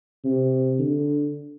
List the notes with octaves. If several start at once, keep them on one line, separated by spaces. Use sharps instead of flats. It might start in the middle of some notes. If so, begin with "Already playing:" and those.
C3
D3